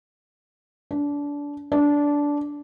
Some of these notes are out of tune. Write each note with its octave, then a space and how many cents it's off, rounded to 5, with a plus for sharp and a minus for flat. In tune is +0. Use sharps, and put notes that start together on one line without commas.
D4 -25
D4 -15